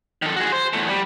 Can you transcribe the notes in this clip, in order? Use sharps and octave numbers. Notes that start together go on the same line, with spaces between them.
D#3 A4
F#4 G#4
C5
E2 A3
G3